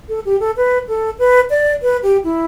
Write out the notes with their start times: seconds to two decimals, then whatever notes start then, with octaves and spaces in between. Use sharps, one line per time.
0.09 A4
0.25 G4
0.40 A4
0.57 B4
0.88 A4
1.19 B4
1.50 D5
1.82 B4
2.03 G4
2.24 E4